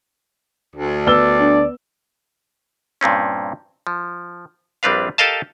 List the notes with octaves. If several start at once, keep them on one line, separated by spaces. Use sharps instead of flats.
D2
B3 D5 E6 G7
D4
G2 A#2 C4 C#4
F3
A#1 G3 C4 D4 B4 F5
G4 A4 A#4 D#5 F5 A5